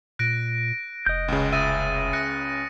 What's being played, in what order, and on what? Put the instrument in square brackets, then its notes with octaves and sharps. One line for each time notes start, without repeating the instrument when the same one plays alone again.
[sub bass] A#2 [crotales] F#6 A#6 D7
[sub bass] F1 [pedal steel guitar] D#5 G6
[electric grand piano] C#2 C#3
[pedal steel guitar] E5 [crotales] D#6 A6 D#7
[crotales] F#6 A#6 C#7